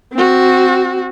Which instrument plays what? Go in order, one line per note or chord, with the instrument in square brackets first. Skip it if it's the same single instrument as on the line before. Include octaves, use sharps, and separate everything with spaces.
[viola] C4 F#4